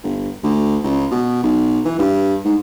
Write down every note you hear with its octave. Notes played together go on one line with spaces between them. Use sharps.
G1
D2
C#2
B2
B1
E3
G2
G#2